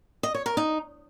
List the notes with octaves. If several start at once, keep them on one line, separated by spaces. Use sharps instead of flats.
D#5
C#5
A#4
D#4